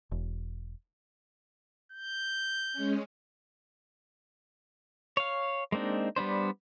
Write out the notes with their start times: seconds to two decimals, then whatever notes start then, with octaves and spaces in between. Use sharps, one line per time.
0.12 E1
1.92 G6
2.73 G#3 C#4
5.17 C#5 F5
5.72 G#3 A#3 C4 D4 D#4
6.16 G3 B3 D4 C5